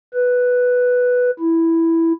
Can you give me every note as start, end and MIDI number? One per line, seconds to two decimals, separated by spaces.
0.14 1.30 71
1.39 2.12 64